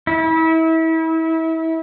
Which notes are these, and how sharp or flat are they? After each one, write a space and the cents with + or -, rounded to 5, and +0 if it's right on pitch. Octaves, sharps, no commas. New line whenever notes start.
E4 -30